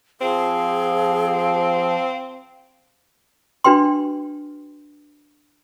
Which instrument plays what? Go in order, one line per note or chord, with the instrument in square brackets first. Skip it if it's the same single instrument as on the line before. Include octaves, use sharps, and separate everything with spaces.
[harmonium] F3 [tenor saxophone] C4 [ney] G#4 [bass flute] F5
[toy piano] D4 F#4 B4 G5 C6